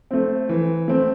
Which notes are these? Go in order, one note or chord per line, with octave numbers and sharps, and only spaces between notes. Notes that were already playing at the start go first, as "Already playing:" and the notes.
A3 C4
E3
A3 C4